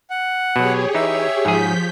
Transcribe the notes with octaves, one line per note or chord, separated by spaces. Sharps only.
F#5
B2 F#3 G4 G#4 C#5
E3 D#4 E5
G#2 F3 G#4 G6 B6